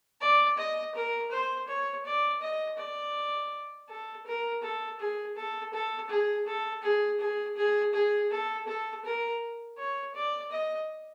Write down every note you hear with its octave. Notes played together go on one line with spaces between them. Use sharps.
D5
D#5
A#4
C5
C#5
D5
D#5
D5
A4
A#4
A4
G#4
A4
A4
G#4
A4
G#4
G#4
G#4
G#4
A4
A4
A#4
C#5
D5
D#5